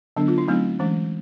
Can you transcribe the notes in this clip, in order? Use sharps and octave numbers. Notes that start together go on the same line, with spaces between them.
D3 F#3 B3 D4
F4
E4
F#3 A3 C4 D#4
E3 G#3 C#4